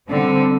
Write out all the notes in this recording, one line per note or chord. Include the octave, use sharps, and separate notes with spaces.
D3 G3 C4